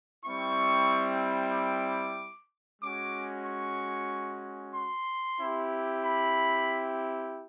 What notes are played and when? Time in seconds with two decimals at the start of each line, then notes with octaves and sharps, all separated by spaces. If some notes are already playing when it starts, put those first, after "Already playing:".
0.24 G3 C4 E4 C#6
1.53 D6
2.82 G#3 C#4 F#4 D6
3.46 C#6
4.74 C6
5.40 C4 E4 G4
6.03 B5